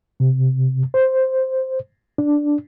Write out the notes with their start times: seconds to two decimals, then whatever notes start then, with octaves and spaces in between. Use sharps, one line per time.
0.20 C3
0.94 C5
2.18 D4